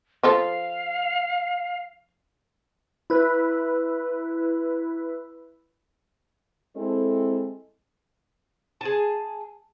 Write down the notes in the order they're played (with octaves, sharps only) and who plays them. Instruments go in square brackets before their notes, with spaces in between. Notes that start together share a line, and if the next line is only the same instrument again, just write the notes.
[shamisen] F3 F4 A4 [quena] F5
[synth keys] E4 B4
[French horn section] G#3 C4 E4 A4
[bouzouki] G#4 A5